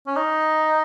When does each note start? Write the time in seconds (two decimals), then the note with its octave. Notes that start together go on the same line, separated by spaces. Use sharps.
0.07 C#4
0.16 D#4